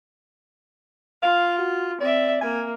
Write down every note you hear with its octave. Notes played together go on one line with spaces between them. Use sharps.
F4 F5
F#4
C4 D5 E5
A#3 G#5